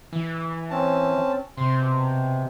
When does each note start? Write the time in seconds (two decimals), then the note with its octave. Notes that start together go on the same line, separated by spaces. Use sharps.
0.13 E3
0.70 C4 C#4 A5
1.58 C3 C6
1.78 B2